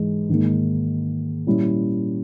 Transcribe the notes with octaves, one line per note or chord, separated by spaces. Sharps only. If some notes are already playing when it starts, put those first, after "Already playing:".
Already playing: G#2 E3 G#3
G#2 D#3 A#3
A#2 G3 C#4 E4